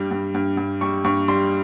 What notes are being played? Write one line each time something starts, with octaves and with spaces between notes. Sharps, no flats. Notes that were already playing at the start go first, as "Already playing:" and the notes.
Already playing: G2 G3
G2
G2
G2
G3 C#6
G2 C#6
G3 C6